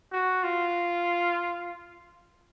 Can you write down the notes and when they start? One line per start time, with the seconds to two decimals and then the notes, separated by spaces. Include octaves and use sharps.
0.12 F#4
0.43 F4